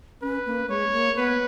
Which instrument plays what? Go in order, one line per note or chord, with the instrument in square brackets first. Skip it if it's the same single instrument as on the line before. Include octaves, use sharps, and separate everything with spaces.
[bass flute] C#4 [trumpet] B4
[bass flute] A#3
[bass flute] G#3 [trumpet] C#5
[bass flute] A#3
[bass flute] B3 [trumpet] B4